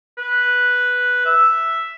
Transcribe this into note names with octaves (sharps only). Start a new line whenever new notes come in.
B4
E5